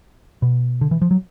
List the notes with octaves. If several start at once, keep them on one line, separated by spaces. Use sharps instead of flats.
B2
D3
E3
F3
F#3